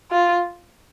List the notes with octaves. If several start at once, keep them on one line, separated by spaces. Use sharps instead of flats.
F4